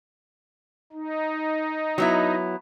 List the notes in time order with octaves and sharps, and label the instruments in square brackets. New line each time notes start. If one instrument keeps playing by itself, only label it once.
[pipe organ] D#4
[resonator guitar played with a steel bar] F#3 B3 E4